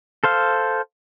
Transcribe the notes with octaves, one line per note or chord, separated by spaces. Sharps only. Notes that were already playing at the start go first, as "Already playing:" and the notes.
A4 C5 F5